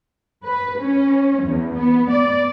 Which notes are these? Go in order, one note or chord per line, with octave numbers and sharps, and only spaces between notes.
B4
C#4
E2
B3
D5